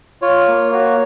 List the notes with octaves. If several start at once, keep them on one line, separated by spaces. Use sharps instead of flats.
F4 C#5
A#3
F#4 C#5